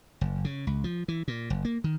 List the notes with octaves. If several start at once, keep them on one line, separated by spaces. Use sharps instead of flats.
F#1
C#3
C#2
F3
E3
A#2
F#1
A#3
D#3